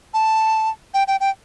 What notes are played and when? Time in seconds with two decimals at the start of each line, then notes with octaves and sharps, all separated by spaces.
0.14 A5
0.94 G5
1.08 G5
1.20 G5